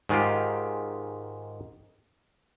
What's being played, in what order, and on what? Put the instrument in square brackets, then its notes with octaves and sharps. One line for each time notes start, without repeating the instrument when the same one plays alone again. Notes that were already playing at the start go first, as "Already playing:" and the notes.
[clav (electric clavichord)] G#2 D#3 G#3 F4 G4